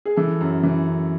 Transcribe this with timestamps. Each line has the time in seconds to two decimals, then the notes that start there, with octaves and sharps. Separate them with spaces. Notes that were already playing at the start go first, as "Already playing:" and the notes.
0.05 G#4
0.17 E3 A4
0.41 F#2
0.63 E3
0.87 F#2